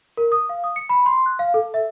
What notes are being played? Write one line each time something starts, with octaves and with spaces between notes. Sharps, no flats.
A#4
D#6
F5
D#6
C#7
B5
C6
F#6
F5
A4
E5